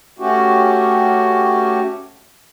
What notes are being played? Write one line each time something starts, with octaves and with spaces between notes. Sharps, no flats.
A3 C#4 F#4 G4